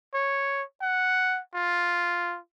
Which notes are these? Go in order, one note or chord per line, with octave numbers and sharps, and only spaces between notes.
C#5
F#5
F4